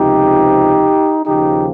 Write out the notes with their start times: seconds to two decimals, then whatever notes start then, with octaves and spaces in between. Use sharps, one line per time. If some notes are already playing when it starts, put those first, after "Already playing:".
Already playing: C#2 C3 F3 D#4 G4
1.26 D#2 C#3 F3 D#4 G4